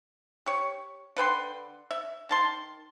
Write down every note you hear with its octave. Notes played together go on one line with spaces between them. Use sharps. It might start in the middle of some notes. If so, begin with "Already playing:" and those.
G4 C#5
D3 B4 G5 C6
E5
D#3 A5 C6